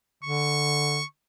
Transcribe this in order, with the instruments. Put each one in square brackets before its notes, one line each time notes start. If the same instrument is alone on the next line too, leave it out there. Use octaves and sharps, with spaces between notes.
[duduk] D3 [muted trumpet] C#6